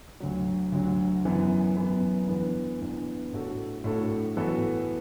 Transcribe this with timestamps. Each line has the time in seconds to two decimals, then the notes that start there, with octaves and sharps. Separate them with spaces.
0.20 D2 D3 F#3
0.72 D2 D3 F#3
1.25 F#2 E3 B3
1.77 F#2 E3 B3
2.28 E2 E3 B3 D4
2.81 E2 E3 B3 D4
3.32 A2 A3 D4 F#4 A4
3.84 A2 A3 D4 F#4 A4
4.37 A2 E3 B3 F#4 A4